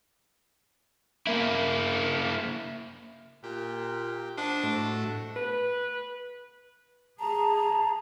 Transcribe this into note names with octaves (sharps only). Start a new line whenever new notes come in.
A#3 E4
A#2 G4
D4 C5 D#5 F#5
A2 A3 F#4
B4
G#4 A5 A#5